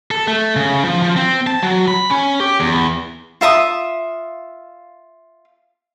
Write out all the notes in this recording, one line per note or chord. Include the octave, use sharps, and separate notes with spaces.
A4
A3
C#3
F3
F3
C4
A5
F#3
B5
C#4
G4
E2
F4 E5 A#5 D#6